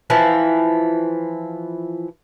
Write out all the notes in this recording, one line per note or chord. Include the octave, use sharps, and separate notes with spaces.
E3 F3 E4